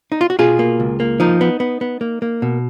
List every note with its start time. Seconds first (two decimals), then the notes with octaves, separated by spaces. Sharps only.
0.12 D#4
0.21 F4
0.30 F#4
0.39 B2 F4 G#4
0.59 A#3
0.80 C#2
1.00 A#3
1.20 F3 D#4
1.41 B3
1.60 B3
1.81 B3
2.01 A#3
2.22 A#3
2.42 B2